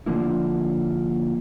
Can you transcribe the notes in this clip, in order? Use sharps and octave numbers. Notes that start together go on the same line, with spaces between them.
D3 F3 A#3 E4